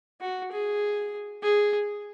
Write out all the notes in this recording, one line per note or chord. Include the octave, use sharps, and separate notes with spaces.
F#4
G#4
G#4